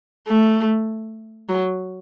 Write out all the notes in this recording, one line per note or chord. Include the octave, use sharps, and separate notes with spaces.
A3
F#3